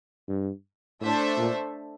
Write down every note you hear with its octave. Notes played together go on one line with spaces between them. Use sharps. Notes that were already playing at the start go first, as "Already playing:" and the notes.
G2
A2 A3 D4 A4 C5 E5
A#2